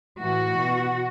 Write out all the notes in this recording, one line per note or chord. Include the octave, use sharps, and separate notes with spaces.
A2 E3 F#4
B2